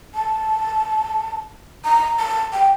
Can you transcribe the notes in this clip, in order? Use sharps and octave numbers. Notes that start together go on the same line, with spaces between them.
A5
A#5
A5
G5